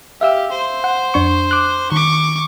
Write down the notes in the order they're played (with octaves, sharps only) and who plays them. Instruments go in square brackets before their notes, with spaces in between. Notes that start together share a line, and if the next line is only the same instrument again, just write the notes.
[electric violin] G4 [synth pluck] E5 F5 E6
[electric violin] C5
[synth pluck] F#5
F2 D4 C#6
D6 F#6
[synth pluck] D#3 [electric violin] C#6 D6